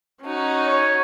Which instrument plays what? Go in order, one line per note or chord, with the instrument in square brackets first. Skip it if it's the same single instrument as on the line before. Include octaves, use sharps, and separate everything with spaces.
[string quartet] C#4 D#4 F#4
[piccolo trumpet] C#5